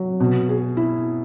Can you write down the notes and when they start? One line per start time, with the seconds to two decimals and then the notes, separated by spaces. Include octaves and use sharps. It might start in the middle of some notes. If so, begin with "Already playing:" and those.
Already playing: F#3
0.20 B2
0.49 G#4
0.77 E4